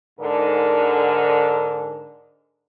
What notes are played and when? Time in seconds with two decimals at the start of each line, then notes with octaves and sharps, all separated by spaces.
0.19 G#2 D3 A#4